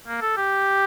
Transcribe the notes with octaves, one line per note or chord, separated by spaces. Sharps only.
A#3
A4
G4